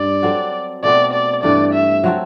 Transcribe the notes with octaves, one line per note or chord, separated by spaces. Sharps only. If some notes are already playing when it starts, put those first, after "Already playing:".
Already playing: G2 D5
F#3 C4 F#4 A4
B2 A3 C4 F#4 D5
D5
G2 E3 A3 D5
E5
F#3 C4 F#4 A4